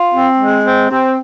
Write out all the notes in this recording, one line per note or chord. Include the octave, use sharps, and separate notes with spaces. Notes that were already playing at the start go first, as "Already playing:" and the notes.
Already playing: F4
C4
G#3
C4
C4